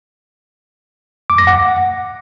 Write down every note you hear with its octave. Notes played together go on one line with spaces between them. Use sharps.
D6
A#6
F#5